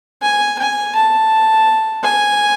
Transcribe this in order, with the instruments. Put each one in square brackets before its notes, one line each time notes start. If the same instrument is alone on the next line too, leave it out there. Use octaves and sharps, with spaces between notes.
[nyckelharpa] G#5
G#5
A5
G#5